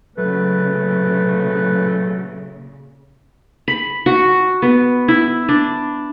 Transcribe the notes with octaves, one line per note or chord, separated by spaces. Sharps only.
A#2 C#3 F#3 A3 B4
B5
F#4
B3
E4
D4